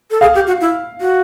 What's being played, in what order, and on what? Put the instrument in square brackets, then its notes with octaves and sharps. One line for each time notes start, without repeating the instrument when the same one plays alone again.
[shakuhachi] A4
[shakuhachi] G#4 [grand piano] F5
[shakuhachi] G4
F#4
E4
F#4